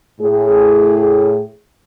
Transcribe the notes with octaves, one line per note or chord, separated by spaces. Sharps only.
A2 G#4